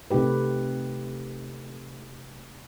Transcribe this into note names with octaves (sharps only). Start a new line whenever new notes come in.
C3 A3 D#4 G4 B4